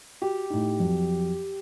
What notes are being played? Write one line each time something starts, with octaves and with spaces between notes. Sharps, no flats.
F#4 G4
A2 D#4
F2 F#3